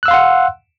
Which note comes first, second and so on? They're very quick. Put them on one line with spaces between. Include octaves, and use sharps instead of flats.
F#6 E6 F5 C6 F#5